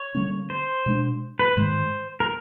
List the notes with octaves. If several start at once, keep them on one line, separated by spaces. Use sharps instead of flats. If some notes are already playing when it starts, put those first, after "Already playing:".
Already playing: C#5
D3 G3 A#3 C#4
C5
B2 G#3 B3 D4
B4
G#2 D#3 G#3 C5
A#4